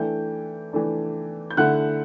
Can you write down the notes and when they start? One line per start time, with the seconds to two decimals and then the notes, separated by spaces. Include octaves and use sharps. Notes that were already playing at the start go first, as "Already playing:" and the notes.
Already playing: E3 A3 D4 G5 G6
0.73 E3 A3 D4
1.50 G6
1.57 D3 A3 E4 F#5 F#6